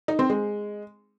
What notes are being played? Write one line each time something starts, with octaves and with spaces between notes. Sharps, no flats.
D#4
C4
G#3